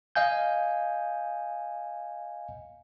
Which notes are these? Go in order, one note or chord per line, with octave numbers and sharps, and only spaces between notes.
D#5 F5 G#5 G6